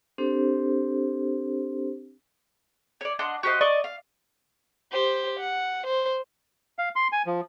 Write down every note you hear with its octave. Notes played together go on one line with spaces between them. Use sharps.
C4 D4 G4 A4 C5
C#5 D5
D4 D#5 F#5 C6
F#4 G4 C5 D#5
D5 D#5 C#6
F5
G4 C5
F#5
C5
F5
C6
G#5
F3